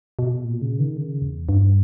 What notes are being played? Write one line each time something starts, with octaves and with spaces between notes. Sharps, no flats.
B2
A#2
C#3
D#3
C#3
E2
G2